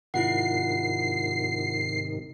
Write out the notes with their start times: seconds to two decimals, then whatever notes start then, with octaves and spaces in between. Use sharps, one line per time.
0.14 G#2 C3 D#3 E4 F4 F#5 C7